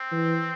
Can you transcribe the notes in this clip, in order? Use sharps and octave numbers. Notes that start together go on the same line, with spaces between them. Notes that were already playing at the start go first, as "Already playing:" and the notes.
Already playing: C4
E3